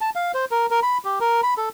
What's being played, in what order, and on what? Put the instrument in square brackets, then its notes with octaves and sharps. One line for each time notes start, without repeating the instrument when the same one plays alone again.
[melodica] A5
F5
C5
A#4
A#4
B5
G4
A#4
B5
A4